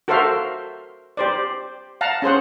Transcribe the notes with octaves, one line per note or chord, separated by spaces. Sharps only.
F#4 A4 A#4 C5 E5 F5
G4 C5 D5
F5 F#5 A5 A#5
C#4 G#4 C5 F#5